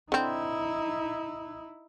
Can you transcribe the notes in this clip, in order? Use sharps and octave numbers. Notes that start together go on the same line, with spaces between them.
D3 C4 D#4 E4